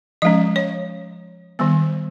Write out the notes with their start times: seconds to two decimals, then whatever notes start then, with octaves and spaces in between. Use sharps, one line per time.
0.22 F3 G#3 C#4 D#5
0.56 C#5
1.59 D#3 G3 B3